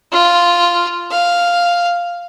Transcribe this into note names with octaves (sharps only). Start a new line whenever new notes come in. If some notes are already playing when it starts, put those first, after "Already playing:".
F4
F5